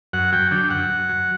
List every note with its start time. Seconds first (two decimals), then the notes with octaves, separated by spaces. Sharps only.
0.13 F#2 F#5
0.32 F#3 G5
0.51 D3 G5
0.70 F#2 F#5
0.90 F#2
1.09 F#3